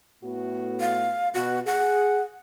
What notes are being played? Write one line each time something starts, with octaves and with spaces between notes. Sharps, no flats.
A2 B3 F#4
F5
B2 F#4
G#4 F#5